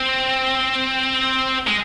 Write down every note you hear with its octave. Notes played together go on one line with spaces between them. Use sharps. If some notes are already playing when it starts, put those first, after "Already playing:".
Already playing: C4
G#3